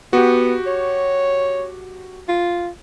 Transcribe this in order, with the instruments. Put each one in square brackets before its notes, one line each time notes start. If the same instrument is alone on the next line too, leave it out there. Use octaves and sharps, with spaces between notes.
[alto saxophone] B3 [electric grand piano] F#4 G4
[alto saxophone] C#5
F4